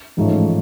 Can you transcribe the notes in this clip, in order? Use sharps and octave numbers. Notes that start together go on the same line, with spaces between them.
A1 G#2 F3 A3 C#4